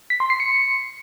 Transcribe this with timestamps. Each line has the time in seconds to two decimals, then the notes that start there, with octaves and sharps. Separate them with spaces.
0.10 B6
0.20 C6
0.30 C7
0.40 C#7